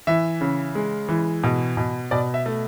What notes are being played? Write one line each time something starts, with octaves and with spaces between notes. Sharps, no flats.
E3 E5
C#3
G#3
E3
B2
B2
B2 D5
E5
A3